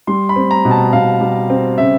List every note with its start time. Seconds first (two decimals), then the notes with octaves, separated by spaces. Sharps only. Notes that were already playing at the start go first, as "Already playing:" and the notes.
0.07 G3 C6
0.29 B5
0.36 C4
0.51 A#5
0.65 B2
0.71 A5
0.93 B2 F5
1.21 G3
1.50 C4
1.78 C#3 E5